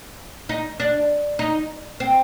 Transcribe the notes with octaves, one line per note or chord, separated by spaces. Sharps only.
D#4
D4
D#4
C4